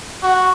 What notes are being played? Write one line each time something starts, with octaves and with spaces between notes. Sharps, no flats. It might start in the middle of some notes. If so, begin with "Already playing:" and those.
F#4